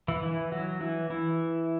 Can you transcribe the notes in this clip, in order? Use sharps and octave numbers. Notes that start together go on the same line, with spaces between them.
E3 E4
E3 E4
F#3 F#4
E3 E4
E3 E4